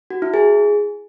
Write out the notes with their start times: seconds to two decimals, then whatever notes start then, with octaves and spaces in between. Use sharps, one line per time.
0.10 F#4
0.22 E4
0.34 G#4